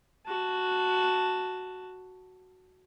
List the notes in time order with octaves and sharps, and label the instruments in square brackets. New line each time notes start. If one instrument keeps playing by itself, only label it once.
[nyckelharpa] F#4 A5